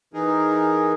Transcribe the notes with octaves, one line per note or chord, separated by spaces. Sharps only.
E3 D#4 G#4 A#4